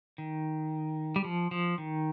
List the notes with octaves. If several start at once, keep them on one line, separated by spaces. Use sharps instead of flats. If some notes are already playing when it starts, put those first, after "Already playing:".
D#3
G3
F3
F3
D#3